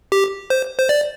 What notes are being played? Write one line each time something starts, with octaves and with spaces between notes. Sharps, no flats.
G4
C5
C5
D5